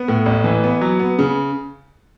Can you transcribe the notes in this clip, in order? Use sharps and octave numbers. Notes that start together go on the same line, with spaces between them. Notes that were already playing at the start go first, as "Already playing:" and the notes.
Already playing: B3
A2
A1
E3
B3
F#3
B3
C#3